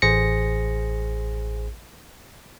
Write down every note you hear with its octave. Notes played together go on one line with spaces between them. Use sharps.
A1 G#4 C5 A#6 C#7